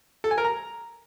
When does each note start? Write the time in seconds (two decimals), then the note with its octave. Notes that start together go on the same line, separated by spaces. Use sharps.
0.24 A4
0.31 G#5
0.38 A#4
0.44 A#5